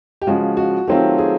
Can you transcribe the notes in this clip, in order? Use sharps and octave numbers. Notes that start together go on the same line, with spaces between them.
G4
C#3 F3 G#3 F#4
F#4
D#3 F#3 A3 C4 F4 G4
G#4